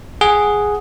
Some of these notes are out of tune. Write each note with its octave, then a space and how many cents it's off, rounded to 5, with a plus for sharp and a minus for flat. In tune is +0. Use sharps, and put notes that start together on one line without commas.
G#4 +0 F#5 +0